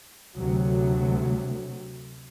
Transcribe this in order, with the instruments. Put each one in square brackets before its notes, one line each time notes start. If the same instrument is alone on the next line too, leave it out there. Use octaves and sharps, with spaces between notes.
[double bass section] D2 C3 F#3 A3